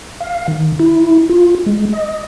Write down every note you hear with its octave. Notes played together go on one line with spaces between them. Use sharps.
F5
D#3
E4
F4
G#3
D#5